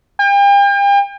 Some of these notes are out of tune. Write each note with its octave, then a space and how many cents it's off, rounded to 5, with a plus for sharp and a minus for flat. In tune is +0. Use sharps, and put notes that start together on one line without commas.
G5 +40